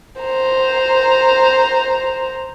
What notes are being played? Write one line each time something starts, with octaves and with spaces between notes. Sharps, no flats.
C5 A#5